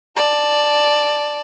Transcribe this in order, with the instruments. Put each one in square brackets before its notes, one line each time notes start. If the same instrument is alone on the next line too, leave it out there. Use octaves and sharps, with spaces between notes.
[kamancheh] D5 A5